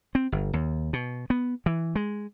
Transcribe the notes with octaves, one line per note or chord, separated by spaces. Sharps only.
C4
G1
D#2
B2
B3
E3
G#3